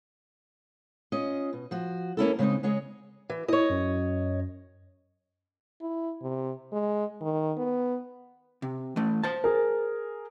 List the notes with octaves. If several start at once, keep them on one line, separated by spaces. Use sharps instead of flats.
C#4 F4 D#5
B2
F3 F#4
A#3 C#4 E4 A4
C#3 G#3 C4 D4 D#4
C#3 G#3 G#4 C#5 D#5
E3
E4 C#5 D#5
F#2
E4
C3
G#3
D#3
B3
C3
E3 A3
C5 A5
G#4 A#4